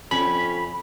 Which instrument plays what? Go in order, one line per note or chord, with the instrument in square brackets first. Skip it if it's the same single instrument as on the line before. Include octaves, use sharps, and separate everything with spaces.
[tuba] F2 [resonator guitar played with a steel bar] C#4 [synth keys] B5